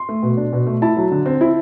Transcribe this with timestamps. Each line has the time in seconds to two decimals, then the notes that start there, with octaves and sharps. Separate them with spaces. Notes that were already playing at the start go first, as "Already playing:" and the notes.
Already playing: C6
0.09 A3
0.23 B2
0.37 D4
0.53 B2
0.67 A3
0.82 E4 A5
0.97 F#3
1.11 D3
1.26 C4
1.41 E4